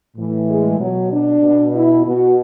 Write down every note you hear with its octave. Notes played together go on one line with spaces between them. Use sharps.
A2 E3
G#3
B2 F#3
D4
B2
E4
B2 F#4